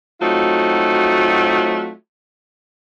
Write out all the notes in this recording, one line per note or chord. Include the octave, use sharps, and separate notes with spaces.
F#3 A3 C4 D#4 F4 F#4